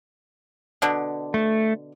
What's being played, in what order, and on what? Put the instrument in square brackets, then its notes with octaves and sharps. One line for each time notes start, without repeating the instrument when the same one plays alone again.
[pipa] B2 D3
[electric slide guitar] A3